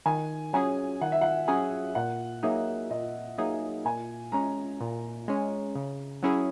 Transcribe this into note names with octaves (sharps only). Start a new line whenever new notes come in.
D#3 G#5
F#3 C#4 G#4 G#5
D#3 F#5
E5
F#5
F#3 C#4 G#4 G#5
A#2 F#5
F#3 A#3 D#4 G#4 E5
A#2 D#5
F#3 A#3 D#4 G#4 E5
A#2 G#5
G#3 C#4 A#5
A#2
G#3 C#4
C#3
F#3 C#4 E4 G#4